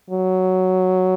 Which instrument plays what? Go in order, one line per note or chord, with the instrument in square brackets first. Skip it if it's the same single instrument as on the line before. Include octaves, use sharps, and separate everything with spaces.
[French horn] F#3